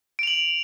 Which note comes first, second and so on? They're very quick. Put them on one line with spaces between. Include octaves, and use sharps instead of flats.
D7 F7 F#7